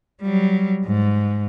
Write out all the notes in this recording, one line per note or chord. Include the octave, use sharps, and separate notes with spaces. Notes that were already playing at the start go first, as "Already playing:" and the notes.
F#3 G3
G#2